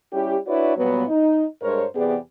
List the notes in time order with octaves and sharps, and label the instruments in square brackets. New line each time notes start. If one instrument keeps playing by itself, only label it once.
[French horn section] G3 C#4 E4 G4
D4 E4 F#4 B4 C#5 D5
A#2 F#3 G3 B3
D#4
G2 G#3 A#4 C5 C#5
E2 C3 B3 G4 G#4 D5